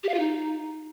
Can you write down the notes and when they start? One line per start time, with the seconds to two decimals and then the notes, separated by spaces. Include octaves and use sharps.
0.03 G4
0.09 F5
0.14 F4
0.19 D#4